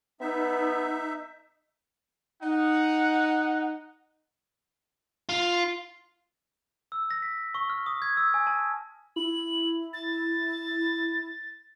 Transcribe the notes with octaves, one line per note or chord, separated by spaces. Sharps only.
B3 D#4 E5
D#4 F#5
F4
E6
A#6
B6
C#6
F6
D#6
G#6
E6
G#5
A5
E4 F#7
A6